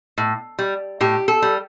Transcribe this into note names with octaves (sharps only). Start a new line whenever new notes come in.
A2
G3
A2 G4
A4
G3